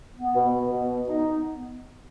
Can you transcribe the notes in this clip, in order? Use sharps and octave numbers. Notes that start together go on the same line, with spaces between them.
B3
B2
B3
B2
B3
D#4
B3